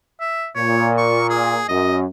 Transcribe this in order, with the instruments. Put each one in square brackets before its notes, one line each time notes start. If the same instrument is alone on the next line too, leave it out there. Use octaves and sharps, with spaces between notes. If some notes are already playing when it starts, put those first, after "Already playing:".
[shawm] E5
[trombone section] A#2 [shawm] C#5
[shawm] C#6
G#4
[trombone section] F#2 [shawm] D#5